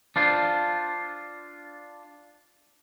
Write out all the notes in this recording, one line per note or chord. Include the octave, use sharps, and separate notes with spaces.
D4 F4 C5